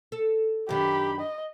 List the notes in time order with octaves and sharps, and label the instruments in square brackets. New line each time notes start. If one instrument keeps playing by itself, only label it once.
[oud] A4
[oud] F#2 D#3 D4 [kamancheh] G4 B5
[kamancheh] D#5